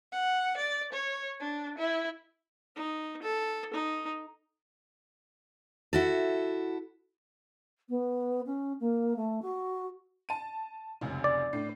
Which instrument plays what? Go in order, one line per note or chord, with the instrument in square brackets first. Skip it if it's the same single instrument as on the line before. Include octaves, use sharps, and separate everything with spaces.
[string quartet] F#5
D5
C#5
D4
E4
[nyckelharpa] D#4
A4
D#4
[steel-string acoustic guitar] E4 F#4 A4
[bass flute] B3
C#4
A#3
A3
F#4
[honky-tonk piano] A5 D#7
F1 C#2 F#2
[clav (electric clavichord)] D5
[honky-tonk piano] A2 D4 C7